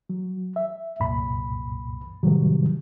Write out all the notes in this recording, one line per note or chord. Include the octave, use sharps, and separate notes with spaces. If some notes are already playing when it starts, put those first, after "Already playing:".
F#3
E5
C2 F#2 A#2 B5
A2 C3 D#3 F#3 G3